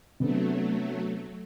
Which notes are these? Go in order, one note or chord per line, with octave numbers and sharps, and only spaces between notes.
C3 F#3 A3 B3 D4